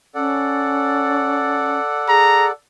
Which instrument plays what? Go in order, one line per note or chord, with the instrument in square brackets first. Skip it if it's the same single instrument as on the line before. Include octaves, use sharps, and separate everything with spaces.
[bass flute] C#4 [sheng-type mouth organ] A4 D5 F#5
[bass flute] G#4 [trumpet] A#5